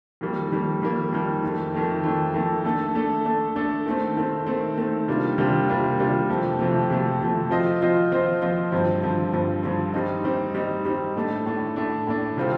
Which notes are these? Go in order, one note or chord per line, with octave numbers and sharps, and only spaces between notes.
F2 D#3 G3 A#3
F2 D#3 G3 A#3
F2 D#3 G3 A#3
F2 D#3 G3 A#3
F2 D#3 A3
F2 D#3 A3
F2 D#3 A3
F2 D#3 A3
A3 D4 A4
A3 D4 A4
A3 D4 A4
A3 D4 A4
D#3 A3 C4
D#3 A3 C4
D#3 A3 C4
D#3 A3 C4
C3 G3 A#3 D4 F4
C3 G3 A#3 D4 F4
C3 G3 A#3 D4 F4
C3 G3 A#3 D4 F4
F2 C3 F3 A3
F2 C3 F3 A3
F2 C3 F3 A3
F2 C3 F3 A3
F3 C4 F4 C5 D#5
F3 C4 F4 C5 D#5
F3 C4 F4 C5 D#5
F3 C4 F4 C5 D#5
G2 D3 F3 C4
G2 D3 F3 C4
G2 D3 F3 C4
G2 D3 F3 C4
G3 C4 D#4
G3 C4 D#4
G3 C4 D#4
G3 C4 D#4
A2 A3 D4
A2 A3 D4
A2 A3 D4
A2 A3 D4
C3 G3 C4 F4 A4